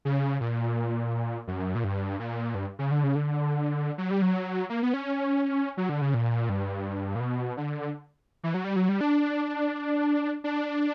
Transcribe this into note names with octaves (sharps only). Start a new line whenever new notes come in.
C#3
A#2
F#2
A#2
G2
A#2
G2
C#3
D3
C#3
D3
F#3
G3
F#3
A#3
B3
C#4
F#3
D3
C#3
A#2
G2
A#2
B2
D3
E3
F#3
G3
F#3
G3
D4
D4